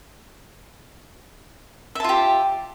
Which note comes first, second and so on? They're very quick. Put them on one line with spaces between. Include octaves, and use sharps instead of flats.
E5 A5 F4 G4